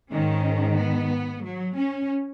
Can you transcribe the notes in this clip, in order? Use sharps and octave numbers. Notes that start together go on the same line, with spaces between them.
G#2 D#3 C#4
B3
F#3
C#4